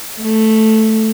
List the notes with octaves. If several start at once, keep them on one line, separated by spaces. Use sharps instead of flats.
A3